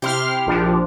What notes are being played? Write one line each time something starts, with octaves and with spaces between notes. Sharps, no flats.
C3 E4 G4 C6 F6
A#1 F3 D4